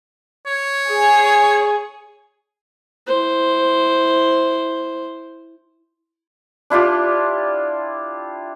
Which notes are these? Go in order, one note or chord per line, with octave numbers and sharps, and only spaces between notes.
C#5
G#4
E4 C5
D4 E4 F4 G4